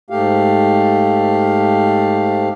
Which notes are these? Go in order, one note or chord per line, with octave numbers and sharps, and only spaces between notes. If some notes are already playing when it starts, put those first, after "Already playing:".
G#2 A3 G4 F5